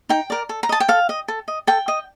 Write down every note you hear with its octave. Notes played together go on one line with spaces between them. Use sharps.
D#4 G5
A#4 D5
A4
A#5
D#5 A5
G5
A4 F5
D#5
A4
D#5
A4 G5
D#5